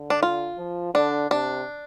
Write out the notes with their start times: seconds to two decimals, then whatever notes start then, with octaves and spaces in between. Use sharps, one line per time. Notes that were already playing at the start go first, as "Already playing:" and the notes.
Already playing: D3
0.10 D4
0.23 F4
0.58 F3
0.94 D3 D4
1.30 C3 D4